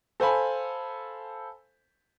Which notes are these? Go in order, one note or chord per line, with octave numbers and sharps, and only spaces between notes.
A4 C5 F5 G#5 B5